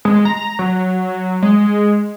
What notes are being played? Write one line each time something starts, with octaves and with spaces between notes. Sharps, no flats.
G#3
A#5
F#3
G#3